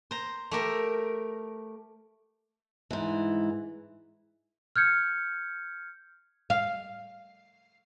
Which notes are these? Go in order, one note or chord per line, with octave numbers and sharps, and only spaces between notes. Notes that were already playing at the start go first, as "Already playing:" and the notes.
C5 A#5
A3 G4 A#4
G#2 E3
F6 G6 G#6 C#7
F5